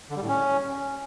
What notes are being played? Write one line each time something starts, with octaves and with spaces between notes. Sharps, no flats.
D3
G3
A2
C#4